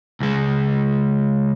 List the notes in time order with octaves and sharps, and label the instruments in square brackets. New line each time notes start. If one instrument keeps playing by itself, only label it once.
[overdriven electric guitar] C#2 G#3